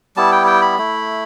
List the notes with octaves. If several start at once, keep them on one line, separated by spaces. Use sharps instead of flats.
G3 B3 E4 A5
G5
G5
B5
A3 E4